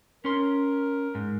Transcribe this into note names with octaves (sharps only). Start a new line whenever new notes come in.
C#4 A#4 C6
G#2